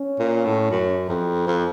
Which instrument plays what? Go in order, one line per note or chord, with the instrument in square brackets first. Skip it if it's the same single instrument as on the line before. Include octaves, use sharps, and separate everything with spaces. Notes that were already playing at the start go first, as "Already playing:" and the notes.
Already playing: [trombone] C#4
[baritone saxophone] A#2
A2
F#2
F2
F2